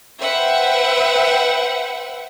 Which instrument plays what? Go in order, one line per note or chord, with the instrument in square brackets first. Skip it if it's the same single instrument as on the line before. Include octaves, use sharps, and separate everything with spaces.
[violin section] B4 C5 E5 F#5 G5